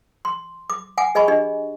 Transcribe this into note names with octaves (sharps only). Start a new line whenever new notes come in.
C6
D6
F#5 G#5 D6
G#4 D#5 G#5 B5 C#6
D4 G4 D#5